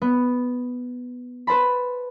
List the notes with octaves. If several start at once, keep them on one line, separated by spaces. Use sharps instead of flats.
B3
B4 C5 A5 B5